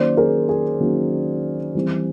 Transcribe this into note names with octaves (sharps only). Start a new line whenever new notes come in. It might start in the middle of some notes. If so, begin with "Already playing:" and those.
Already playing: D#3 F#3 A#3 C#4 C5 D5
G#4 A#4
G#4
D#3 F#3 A#3 C#4
E3 G3 C4